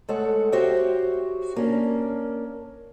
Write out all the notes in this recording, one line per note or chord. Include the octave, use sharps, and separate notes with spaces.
G#3 A3 A4 C#5 F#5
F#4 G4 C5 C#5 E5 G5
A#3 C#4 D4